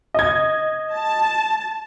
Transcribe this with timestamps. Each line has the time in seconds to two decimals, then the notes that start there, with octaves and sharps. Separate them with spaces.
0.14 D#5 G#6
0.93 A5